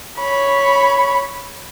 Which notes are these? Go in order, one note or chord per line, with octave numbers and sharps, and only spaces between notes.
C#5 B5